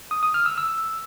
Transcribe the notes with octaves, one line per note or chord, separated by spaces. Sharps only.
D#6
D#6
F6
E6
E6